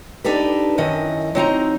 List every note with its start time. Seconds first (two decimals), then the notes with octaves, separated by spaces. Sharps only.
0.24 D4 D#4 G4 A4 B4
0.78 F#2 D#3 E3 D#5
1.35 F#3 C4 D#4 A#5